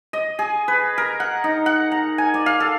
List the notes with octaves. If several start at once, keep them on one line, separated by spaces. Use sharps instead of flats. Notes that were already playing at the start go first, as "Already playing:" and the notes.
D#5
G#4
B4
A#4
F#5
D#4
F#5
A#5
G#5
D5
F5
A4